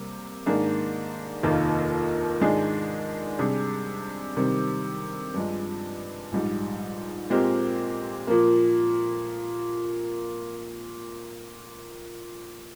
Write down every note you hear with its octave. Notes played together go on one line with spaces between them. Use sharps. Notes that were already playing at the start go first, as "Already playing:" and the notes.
Already playing: C3 G3 A#3
G#2 D#3 A#3 D4 G#4
F1 D#2 D#3 A#3 F4
G#2 D#3 G#3 D4 G#4
C3 G3 D4 G#4
C3 D#3 G3 C4 G4
G2 F3 G#3
A#1 G#2 G3
A#2 G#3 C4 G4 A#4
A#2 F3 A#3